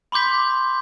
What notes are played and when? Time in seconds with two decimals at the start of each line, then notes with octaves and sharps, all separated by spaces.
0.12 B5 C6 D6 G6 B6